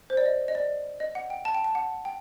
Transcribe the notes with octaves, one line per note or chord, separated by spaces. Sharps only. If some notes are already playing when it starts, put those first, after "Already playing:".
C5
D5
D#5
D#5
D5
D#5
F#5
G5
A5
G5
A5
F#5
G5